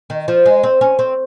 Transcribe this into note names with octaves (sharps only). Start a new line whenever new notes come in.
D#3
F3
G#3
C4
C#4
C4